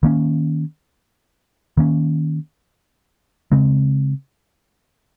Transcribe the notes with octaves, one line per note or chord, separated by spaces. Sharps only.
D#3 A#3 C#4
D#3 A#3 C#4
C#3 G#3 C4